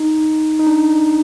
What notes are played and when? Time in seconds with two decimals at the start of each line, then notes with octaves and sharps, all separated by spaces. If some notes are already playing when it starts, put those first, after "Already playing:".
Already playing: D#4
0.59 D#4
0.67 D4